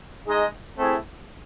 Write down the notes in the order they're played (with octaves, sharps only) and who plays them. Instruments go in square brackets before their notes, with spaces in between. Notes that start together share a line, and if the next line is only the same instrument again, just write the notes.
[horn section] G#3 D#4 G#4 D#5
A3 C4 E4 G#4